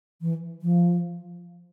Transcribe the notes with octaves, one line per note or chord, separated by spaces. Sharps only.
E3
F3